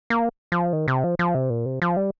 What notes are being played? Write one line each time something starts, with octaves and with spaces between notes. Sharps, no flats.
A#3
F3
D#3
C3
F3
F3
C3
A#2
C3
F3
G3